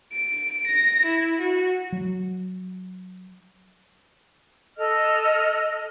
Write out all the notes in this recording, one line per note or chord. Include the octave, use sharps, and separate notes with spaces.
D7
A#6
E4
F#4
F#3
A4 D#5 F6